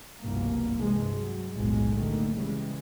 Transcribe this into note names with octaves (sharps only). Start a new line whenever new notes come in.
F1 C2 G2 B2 A#3
G2 C3 E3 G#3
F#3
F1 B1 F#2 A2 G#3
D3 D#3 A3 A#3
C#3 E3 G3 G#3